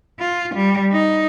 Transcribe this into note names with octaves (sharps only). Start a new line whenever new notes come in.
F4
G3
D#4